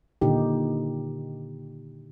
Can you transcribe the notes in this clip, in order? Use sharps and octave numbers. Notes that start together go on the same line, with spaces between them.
A#2 D3 D#3 D#4 G4